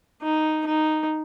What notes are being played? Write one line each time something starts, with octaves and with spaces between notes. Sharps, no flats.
D#4
D#4